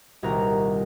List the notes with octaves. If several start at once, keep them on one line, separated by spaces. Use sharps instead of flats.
D#1 C2 F#4 A#4 A#5